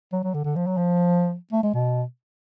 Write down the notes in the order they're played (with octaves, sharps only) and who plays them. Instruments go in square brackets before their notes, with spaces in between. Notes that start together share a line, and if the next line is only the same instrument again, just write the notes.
[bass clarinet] F#3
F#3
D3
D3
F3
F#3
F3
A3
G#3
B2